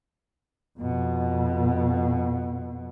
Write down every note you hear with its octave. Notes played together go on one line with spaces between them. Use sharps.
F2 B2